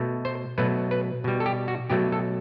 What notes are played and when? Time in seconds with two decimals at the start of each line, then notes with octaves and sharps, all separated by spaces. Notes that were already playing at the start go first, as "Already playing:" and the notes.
Already playing: B2 A3
0.25 C5
0.58 B2 F#3 A3 B4
0.91 B4
1.24 B2 G3
1.40 A4
1.46 G4
1.68 F#4
1.90 B2 F#3 A3 G4
2.12 A4